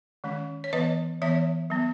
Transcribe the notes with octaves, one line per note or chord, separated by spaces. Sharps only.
D#3 G#3 C#4
C#5
E3 B3 B4 D#5
E3 B3 C#5 E5
F#3 B3